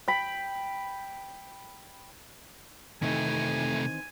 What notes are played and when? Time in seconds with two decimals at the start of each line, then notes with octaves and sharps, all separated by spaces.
0.08 G5 B5
3.02 C3 D#3 E3 A3 C4 G#5